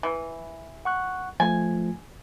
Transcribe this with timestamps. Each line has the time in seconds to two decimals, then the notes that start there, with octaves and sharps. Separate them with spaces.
0.03 E3
0.85 F#5 C#6 F#6
1.40 F3 A3 F4 G#5